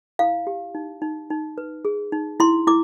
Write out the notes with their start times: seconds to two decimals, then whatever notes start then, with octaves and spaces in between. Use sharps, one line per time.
0.19 E4 F5
0.47 G4
0.75 D#4
1.02 D#4
1.30 D#4
1.58 B4
1.85 G#4
2.12 D#4
2.40 E4 C6
2.67 E4 D6